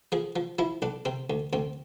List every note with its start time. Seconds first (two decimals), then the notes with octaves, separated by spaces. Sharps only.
0.12 F3 G#4
0.36 F3
0.59 F3 E4
0.82 B1 D4
1.05 C3 C4
1.30 D2
1.53 D2 C4